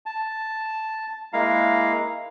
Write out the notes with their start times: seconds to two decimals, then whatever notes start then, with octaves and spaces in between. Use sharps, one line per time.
0.06 A5
1.33 G#3 A#3 E4 F5 A#5